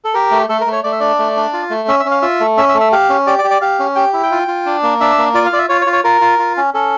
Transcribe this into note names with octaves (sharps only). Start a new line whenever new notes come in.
A4
G4 A#4
A3
A3 A4
A#4
A3
C#5
A3 D5
E5
D4 D5
A3
D4
F4
A3
C#4 E5
E5
C#4
F5
F4 E5
A3
C#4 E5
E5
A3
E5
G4 F5
C#4
G4 D5
D5
G4
D5
G4 F5
C#4
G4 G5
E4
G5
F4
F4
D4
A#3
D4 E5
A#3
F4 D5
F5
F4 D5
E5
F4 C#5
C#5
F4
C#5
F4 A#4
F4
F4
C#4
C#4 A4